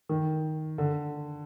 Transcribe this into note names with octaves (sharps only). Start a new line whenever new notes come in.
D#3
D3